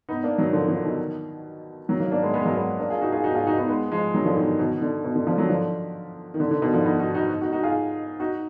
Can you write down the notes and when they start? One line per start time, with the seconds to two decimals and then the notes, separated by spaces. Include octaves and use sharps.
0.09 B3 D#4
0.23 A#3 D4
0.38 D#3 F#3
0.53 D3 F3
0.68 D3 F3
0.83 B2 D#3
1.89 D#3 F#3
2.00 F#3 A#3
2.11 A#3 D4
2.22 G#3 B3
2.34 G#3 B3
2.45 F#3 A#3
2.56 G#3 B3
2.79 A#3 D4
2.90 F4 G#4
3.01 D#4 F#4
3.12 F4 G#4
3.24 D#4 F#4
3.35 F4 G#4
3.47 D#4 F#4
3.58 B3 D#4
3.69 G#3 B3
3.92 F3 G#3
4.14 D#3 F#3
4.25 D3 F3
4.37 B2 D#3
4.59 B2 D#3
4.82 D3
5.04 B2
5.16 D3
5.27 D3 F3
5.38 D#3 F#3
5.49 D3 F3
6.34 D#3
6.40 D3
6.51 D3
6.62 B2 D#3
6.73 D3 F3
6.84 B3 D#4
7.00 D#4 F#4
7.15 D#4 F#4
7.41 D#4 F#4
7.52 D#4 F#4
7.63 F4 G#4
8.20 D#4 F#4